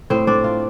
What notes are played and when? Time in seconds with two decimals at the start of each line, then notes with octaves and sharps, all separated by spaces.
0.10 A2 C4 C5
0.27 C4 D4 D5
0.44 F4